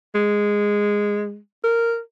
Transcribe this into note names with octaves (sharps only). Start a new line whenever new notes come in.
G#3
A#4